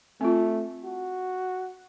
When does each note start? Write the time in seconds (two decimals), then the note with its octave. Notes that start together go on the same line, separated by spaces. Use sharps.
0.21 A3 C4 F4
0.85 F#4